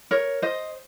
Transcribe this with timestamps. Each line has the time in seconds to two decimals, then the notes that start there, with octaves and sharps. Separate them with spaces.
0.11 A#4 C#5
0.42 C5 D#5